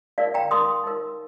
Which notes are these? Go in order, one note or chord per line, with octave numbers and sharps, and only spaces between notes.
D#4 A#4 D5 F5
G5 A#5
D#4 A#4 C6 D#6
D#4 A#4